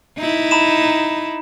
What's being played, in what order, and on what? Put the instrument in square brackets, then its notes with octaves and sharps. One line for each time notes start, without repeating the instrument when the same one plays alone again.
[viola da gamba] D#4 E4
[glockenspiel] A#5 B5 E7